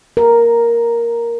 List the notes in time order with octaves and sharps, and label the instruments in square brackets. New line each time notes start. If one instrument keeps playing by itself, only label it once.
[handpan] A#4